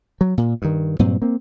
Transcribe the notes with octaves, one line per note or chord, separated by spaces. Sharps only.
F#3
A#2
G2 D#3
G2 A#2 F#3 C4
A#3 C4